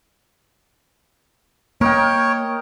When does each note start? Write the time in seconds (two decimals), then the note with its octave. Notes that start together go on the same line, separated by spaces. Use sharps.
1.81 A#3 A#4 C#5 D#5 G5